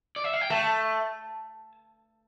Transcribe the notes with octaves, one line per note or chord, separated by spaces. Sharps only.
D5
E5
F5
G5
A3 A5